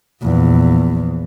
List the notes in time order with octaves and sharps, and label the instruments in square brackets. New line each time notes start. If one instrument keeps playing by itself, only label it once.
[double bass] A#1 E2